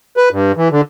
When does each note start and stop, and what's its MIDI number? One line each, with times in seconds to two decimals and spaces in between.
0.17 0.29 71
0.32 0.52 43
0.57 0.68 52
0.71 0.81 50